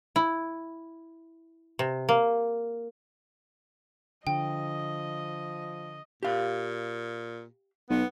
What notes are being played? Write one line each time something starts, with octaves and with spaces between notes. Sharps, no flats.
E4
C3
A#3
D3 F3 D#5 G5
A#2 G4 F5
B1 B3